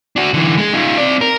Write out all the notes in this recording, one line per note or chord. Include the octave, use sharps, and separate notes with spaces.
D4 F#4
D3 E3
G#3 G#4
D#4 F4
C4 D5
A#4